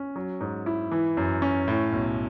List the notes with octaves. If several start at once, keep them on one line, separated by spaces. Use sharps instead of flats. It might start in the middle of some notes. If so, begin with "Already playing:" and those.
Already playing: C#4
F#3
G#2
E4
E3
F#2
C#4
A2
B1